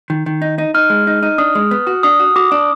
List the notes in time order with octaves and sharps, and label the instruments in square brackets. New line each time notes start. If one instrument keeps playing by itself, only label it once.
[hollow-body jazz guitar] D#3
D#3
D#4
D#4
[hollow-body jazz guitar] D#4 [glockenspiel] F6
[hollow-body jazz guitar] G#3
D#4
D#4
[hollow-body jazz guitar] D4 [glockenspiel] D#6
[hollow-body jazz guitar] G#3
B3
F#4
[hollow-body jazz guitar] D4 [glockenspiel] D#6
[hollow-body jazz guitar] F#4
[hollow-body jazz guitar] F#4 [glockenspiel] D6
[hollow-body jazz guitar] D4